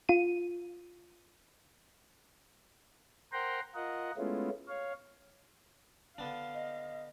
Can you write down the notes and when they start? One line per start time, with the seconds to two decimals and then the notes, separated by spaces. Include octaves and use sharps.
0.09 F4 D#7
3.32 A#4 C5 F#5 G5 A#5 C6
3.75 F4 A#4 D#5 F#5
4.17 G#3 A3 B3 C#4 E4 F4
4.68 C#5 F5
6.18 D3 B3 D4 F5
6.54 D#5